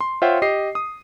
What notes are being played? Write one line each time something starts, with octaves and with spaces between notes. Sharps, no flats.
C6
F4 C5 C#5 E5 F#5 G5
G4 D#5 C7
D#6